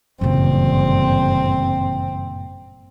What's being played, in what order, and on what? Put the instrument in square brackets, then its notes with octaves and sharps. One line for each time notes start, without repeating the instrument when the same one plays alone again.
[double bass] G1 [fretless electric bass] F#2 A#2 [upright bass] C#3 E3 [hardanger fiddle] C4